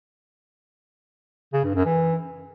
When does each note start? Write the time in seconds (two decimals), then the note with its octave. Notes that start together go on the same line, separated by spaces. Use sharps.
1.53 C#3
1.64 G2
1.75 F#2
1.86 E3